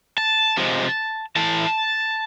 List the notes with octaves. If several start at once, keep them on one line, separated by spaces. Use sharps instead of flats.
A5
C3 F3 G#3
A2 E3 A3 A5